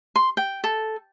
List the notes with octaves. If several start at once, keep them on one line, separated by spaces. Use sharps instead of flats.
C6
G5
A4